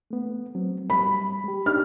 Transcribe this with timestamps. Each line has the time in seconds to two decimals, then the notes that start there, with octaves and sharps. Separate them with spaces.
0.11 A3 B3
0.55 F#3 C4
0.90 G3 B5
1.44 G#3 G4
1.66 D4 D#4 G4 F6